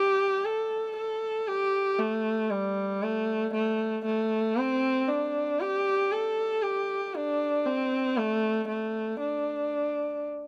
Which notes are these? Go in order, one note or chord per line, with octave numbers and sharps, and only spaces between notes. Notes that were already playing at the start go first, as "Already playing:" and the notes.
Already playing: G4
A4
A4
G4
A3
G3
A3
A3
A3
C4
D4
G4
A4
G4
D4
C4
A3
A3
D4